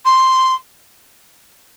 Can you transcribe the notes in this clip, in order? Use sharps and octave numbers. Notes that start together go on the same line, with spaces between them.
C6